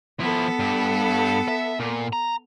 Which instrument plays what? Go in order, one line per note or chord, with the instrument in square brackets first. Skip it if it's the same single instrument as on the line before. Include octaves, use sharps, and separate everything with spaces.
[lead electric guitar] F3 E4 [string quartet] B3 A4
[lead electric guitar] G2
E5
A#2
A#5